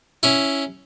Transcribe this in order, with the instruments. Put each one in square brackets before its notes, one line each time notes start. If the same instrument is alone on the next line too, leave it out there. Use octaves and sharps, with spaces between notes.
[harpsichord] C#4 E4